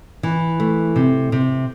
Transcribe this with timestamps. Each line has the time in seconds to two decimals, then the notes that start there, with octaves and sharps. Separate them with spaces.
0.23 E3
0.60 A3
0.96 C3
1.32 C3